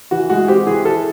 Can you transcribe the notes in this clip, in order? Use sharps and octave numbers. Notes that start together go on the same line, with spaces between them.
E3 F#4
G#3 F#4
C4 G4
E3 G#4
E3 A4